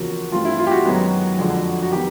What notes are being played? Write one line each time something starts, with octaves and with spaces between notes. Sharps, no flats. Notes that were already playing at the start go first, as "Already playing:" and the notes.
Already playing: E2 C#3 F3 A#3 F#4
G2 E3 A3 C4 F4
E4
F4
G4
F#4
F#2 D#3 G#3 B3
F2 D3 F3 G#3
F#4
D#3 F#3 B3 G4